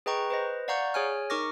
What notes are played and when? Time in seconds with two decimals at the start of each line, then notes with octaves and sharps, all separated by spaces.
0.06 G#4 B4 D#5 G5 A#5 C#6
0.30 B4 C5 D#5
0.68 D5 F5 F#5 A#5 C#6 G6
0.94 G#4 C#5 G#5 F6
1.30 D#4 A#4 C#6 D6 F6 A#6